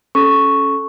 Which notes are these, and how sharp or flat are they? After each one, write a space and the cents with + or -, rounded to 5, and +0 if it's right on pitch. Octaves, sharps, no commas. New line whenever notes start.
C#4 +0 A4 -20 C#6 +0